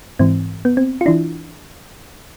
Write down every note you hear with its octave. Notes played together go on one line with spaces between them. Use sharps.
G#2 E3 C4
B3
C4
F4
E3 D4 E4